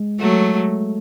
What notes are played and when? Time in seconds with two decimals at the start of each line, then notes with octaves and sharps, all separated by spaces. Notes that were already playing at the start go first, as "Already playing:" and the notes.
Already playing: G#3
0.19 F#3 A3